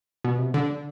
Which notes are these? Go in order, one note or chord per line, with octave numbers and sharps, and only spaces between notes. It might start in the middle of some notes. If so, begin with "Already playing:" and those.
B2
C3
D3